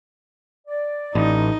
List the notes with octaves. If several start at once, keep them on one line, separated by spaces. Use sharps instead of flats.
D5
A1 D#4